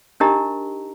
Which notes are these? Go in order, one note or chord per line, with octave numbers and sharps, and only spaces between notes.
D4 D#4 G4 A#4 D#5 A#5